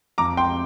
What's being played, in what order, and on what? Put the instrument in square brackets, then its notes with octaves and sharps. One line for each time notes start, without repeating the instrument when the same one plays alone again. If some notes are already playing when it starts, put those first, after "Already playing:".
[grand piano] F2 A#5 D6
G5 C6